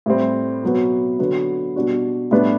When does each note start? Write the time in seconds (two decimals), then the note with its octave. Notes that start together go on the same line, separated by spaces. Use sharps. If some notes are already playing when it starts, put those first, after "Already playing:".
0.06 A2 G3 C4
0.63 B2 F#3 B3 F#4
1.19 D3 F#3 B3 F#4
1.76 B2 G3 D4 F#4
2.31 A2 G3 B3 D4